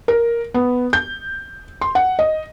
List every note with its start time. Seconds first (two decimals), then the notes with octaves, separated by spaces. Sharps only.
0.08 A#4
0.54 B3
0.93 G6
1.81 C6
1.95 F#5
2.19 D#5